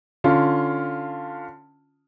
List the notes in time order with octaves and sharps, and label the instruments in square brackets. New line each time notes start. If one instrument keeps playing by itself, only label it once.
[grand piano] D3 C#4 F4